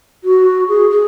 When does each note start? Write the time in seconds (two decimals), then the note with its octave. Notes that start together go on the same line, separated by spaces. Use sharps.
0.24 F#4
0.68 G#4
0.90 G#4